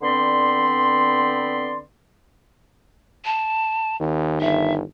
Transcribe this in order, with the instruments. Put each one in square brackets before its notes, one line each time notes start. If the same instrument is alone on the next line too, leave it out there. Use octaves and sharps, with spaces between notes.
[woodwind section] D3 B3 C4 D5 B5 C6
[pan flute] A5
[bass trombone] D#2 [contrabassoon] D#3
[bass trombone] G1 [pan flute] E5